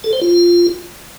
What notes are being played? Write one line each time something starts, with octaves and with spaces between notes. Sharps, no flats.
A4
C5
F4